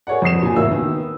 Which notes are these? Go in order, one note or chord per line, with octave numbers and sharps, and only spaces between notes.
G#4 A#4 C#5 D5 F#5
F2 C5 D#6 C7 E7
A#2 G#5
E2 A2 A#3 F#4 E5 E6
D#3 B3